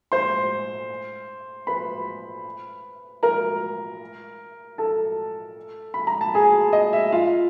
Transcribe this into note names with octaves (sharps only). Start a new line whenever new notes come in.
C5 C6
B4 B5
A#4 A#5
A4 A5
B5
A#5
A5
G#4 G#5
D#5
E5
F4 F5